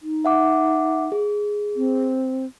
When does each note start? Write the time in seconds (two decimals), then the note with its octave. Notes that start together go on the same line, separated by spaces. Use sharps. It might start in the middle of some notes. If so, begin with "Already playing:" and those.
0.02 D#4
0.25 E5 F#5 D6
1.12 G#4
1.76 C4